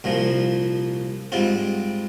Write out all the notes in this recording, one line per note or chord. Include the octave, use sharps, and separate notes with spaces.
C2 A#2 F3
G#2 G3 C4 F4